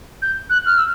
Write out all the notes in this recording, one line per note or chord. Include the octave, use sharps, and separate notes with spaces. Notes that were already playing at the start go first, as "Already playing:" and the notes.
G6
F#6
F6
E6